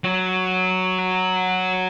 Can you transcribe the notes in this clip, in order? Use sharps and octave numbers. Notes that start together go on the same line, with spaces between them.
F#3